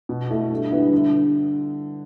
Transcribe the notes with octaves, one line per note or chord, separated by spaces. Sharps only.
B2
A3 E4
G2
D3 G3 B3 E4
D3